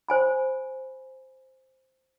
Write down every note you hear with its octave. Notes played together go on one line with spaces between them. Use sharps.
C5 G#5 B5